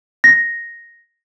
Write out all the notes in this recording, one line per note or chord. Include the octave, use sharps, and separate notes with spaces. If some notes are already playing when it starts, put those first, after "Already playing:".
A#6